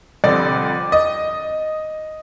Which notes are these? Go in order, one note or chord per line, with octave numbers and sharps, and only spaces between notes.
F2 D3 G3 C4 D5
D#5